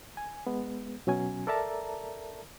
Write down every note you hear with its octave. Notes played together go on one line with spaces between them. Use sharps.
G#5
G#3 B3
B2 F#3 C#4 G#5
A4 A#4 D5 E5 A5 A#5